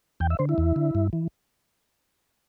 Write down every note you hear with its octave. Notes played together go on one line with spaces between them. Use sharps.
E2 G5
E5
D3 C5
E4
E2
D3
G2
E3